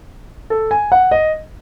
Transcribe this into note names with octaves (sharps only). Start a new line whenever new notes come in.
A4
G#5
F#5
D#5